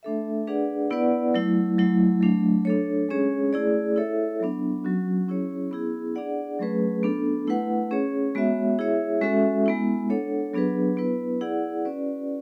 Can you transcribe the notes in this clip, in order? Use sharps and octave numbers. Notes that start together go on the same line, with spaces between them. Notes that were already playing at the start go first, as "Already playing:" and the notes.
A3 D4 A4 E5
D4 G#4 B4 D5 F#5
B3 E4 B4 D5 F#5
F#3 A3 E4
F#3 A3 E4
F#3 A3 D4
D4 A4 C#5
G#3 C#4 G#4 C#5
A3 E4 G#4 D5
E4 A4 C#5 E5
F#3 B3 D4
F#3 C#4 F#4
C#4 E4 G#4 C#5
B3 E4 G#4
D4 G#4 D5 F#5
F#3 A3 C#4 G#4 B4
B3 D4 A4
A3 E4 B4 F#5
C#4 G#4 C#5
G#3 B3 F#4 C#5 E5
E4 G#4 C#5 E5
G#3 C#4 F#4 A4 E5
G#3 B3 E4
D4 A4 C#5 F#5
F#3 B3 D4 G#4 B4
B3 E4 B4
E4 G#4 D5 F#5
C#4 F#4 B4 D5